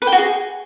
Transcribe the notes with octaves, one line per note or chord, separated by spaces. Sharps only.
B4
G5
F#4
G#4